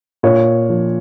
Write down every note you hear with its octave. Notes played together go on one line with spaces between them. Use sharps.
A#2 C#5
F3